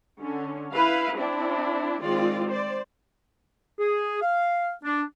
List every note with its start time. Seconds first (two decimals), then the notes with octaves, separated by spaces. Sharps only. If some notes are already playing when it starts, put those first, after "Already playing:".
0.20 D3 C#4
0.71 E4 B4 F5
1.16 C4 D4 E4
2.01 D#3 G#3 C4 F4 D5
2.50 C5 D5
3.78 G#4
4.22 F5
4.84 D4